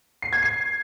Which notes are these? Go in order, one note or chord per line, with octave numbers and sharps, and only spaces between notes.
C7
G#6
C7